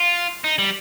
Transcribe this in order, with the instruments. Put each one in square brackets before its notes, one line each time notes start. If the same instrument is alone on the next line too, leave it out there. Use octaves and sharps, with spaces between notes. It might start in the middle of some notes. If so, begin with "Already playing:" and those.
Already playing: [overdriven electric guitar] F4
D#4
G3